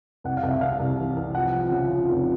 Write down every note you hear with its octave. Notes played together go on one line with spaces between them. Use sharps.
C2 F#5
F5
C2
E5
C3 F5
C2
E3
C2
F3 F#5
F3
C#3
F3
F1